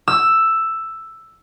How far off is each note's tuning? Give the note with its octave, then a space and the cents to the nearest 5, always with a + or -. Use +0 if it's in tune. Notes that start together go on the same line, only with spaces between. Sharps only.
E6 +5